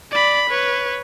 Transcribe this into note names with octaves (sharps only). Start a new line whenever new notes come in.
D5 B5
B4 C#5